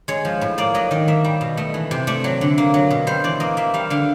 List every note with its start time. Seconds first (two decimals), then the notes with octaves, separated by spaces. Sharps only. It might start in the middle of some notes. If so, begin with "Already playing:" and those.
0.08 G#3 C#5
0.25 F3
0.41 A2
0.58 A#3 D5
0.74 F#3 D#5
0.91 D#3 D#5
1.08 A#3 E5
1.24 G3
1.41 B2
1.57 A3 D#5
1.74 E3
1.91 C3
2.07 A3 D5
2.24 F#3
2.41 D3
2.58 A#3
2.74 F#3
2.90 B2
3.07 G3 C5
3.24 E3 D5
3.40 A#3 D#5
3.57 A#3 E5
3.74 G3 F5
3.90 D3 F5